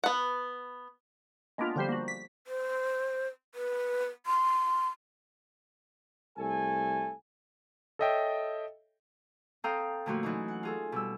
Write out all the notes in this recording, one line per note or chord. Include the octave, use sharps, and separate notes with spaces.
B3 F#5
G#3 A#3 B3 D4 F4
D3 F3 G3 G4 C5
A#3 F#4
B6
C5
B4
C6
C2 A3 A4 G#5
A4 C#5 D#5 E5 G5
C4 A4 F5 G5 A#5 D#6
A#2 D3 F3 A3 F#4
E3 F#3 C#4 D#4
F#5
F4 G#4 A4
B2 G3 E6